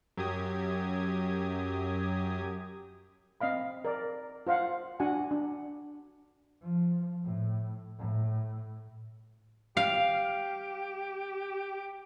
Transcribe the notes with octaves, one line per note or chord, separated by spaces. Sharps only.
F#2 F#3 G4 D#6 G#6
C4 D#5 F5 B5
A#4 D5
F4 C5 F5 F#5
D4 F#4 F#5 G#5
D4
F3
A2
A2
G4 F5